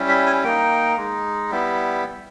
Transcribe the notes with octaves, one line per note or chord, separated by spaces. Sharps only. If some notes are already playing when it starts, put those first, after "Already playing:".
Already playing: G3 C#4 E4
E5
G#5
A#3 D#4 G5
G#3 D#4
G3 B3 E4